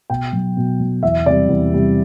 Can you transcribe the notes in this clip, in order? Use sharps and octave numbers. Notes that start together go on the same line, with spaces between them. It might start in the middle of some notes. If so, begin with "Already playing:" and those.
B2 G5
F#3
B2
F#3
E2 E5
C3 G3 D5
E2
C3 G3